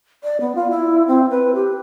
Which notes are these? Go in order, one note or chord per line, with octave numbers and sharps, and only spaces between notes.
D5
B3
F4
E4
C4
B4
G4